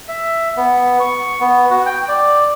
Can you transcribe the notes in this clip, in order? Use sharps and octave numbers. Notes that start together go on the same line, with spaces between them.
E5
B3
C#6
B3
F#4
G5
D5